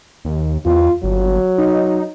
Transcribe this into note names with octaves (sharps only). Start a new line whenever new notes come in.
D#2
E2 F4
G1 F#3
D#4